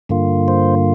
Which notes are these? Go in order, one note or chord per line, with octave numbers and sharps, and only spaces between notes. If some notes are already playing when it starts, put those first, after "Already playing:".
G2 D3 A#3 F4
C5